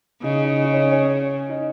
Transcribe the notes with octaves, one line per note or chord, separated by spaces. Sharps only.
C#3 D#4
D#4
D#4
C#4
C#4
D#4